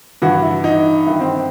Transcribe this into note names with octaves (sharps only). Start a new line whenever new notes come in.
G2 E3 F#4
E4
D#4
G2 D#3 E4
C4